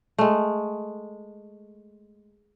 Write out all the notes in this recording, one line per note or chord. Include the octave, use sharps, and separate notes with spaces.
G#3 A3